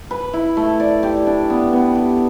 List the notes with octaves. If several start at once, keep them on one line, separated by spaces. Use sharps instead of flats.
B4
E4
A3
D5
G4
D4
B3
B3
G4